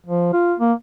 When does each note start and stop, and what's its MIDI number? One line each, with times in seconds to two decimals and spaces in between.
0.06 0.29 53
0.33 0.54 65
0.59 0.73 58